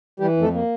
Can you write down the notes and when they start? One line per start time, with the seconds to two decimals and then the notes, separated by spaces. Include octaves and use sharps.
0.20 E3 G3 G4
0.37 F2
0.42 A3 A4
0.54 A#3